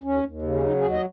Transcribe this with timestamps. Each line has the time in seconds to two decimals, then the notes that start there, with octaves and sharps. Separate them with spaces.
0.04 D#2 C#4
0.24 D#2
0.42 C#3
0.55 C#4
0.62 F#3 D#4
0.77 G#4
0.82 D#2
0.91 D#5